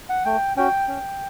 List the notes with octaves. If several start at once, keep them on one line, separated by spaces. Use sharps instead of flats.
F#5
A3 G5
C#4 F#4 G5
C#4